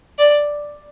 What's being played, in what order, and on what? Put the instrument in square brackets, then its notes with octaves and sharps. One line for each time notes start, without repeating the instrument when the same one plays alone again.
[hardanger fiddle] D5